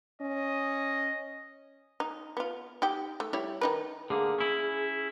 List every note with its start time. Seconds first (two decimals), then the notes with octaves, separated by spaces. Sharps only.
0.22 C#4 D#5
2.00 D#4
2.37 B3 F4
2.82 D#4 G4 G5
3.20 A3
3.33 G3 E4 C#5
3.61 D#3 D#4 B4
4.10 D3 A#3 G#4
4.38 C#4 E4